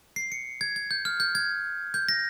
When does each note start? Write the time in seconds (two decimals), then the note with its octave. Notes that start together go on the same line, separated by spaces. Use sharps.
0.16 C7
0.32 C#7
0.61 G#6
0.76 G#6
0.91 G6
1.05 F6
1.20 G6
1.35 G#6
1.94 G6
2.09 A#6